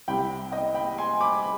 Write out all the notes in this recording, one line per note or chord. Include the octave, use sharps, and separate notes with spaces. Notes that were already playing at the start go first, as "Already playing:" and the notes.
C2 C3 G3 G5 B5
D#5 G5
G5 B5
G#5 C6
B5 D6
B5